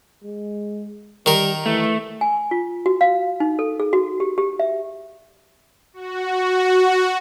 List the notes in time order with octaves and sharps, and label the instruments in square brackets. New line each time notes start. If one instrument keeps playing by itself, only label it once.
[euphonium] G#3
[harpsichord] D#3 A#4 [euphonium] G3
[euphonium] E3 [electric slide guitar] A3
[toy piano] G#5
F4
F#4
F5
D#4
A4
G#4
F#4
G4
G4
E5
[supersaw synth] F#4